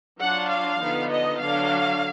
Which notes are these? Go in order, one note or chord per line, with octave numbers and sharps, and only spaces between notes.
F#3 D4 F4 F#5
F5
D3 F3 B3 D#4
D#5
D3 F#3 D4 F5